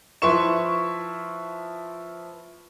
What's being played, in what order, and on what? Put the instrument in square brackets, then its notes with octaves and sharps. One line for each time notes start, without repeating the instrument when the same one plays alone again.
[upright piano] F3 E4 B4 C6 C#6 E7